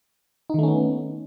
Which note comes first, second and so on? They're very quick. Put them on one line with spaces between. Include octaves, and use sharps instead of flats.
D#4 D#3 A3 C#4 B3